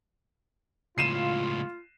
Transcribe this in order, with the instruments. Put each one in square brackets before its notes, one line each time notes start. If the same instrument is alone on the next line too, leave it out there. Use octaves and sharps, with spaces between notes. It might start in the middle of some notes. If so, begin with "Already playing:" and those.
[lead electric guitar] C#2 A2 [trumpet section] F4 [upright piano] C7 D#7 E7